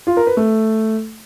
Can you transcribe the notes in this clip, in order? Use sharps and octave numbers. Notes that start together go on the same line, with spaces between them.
F4
A#4
B4
A3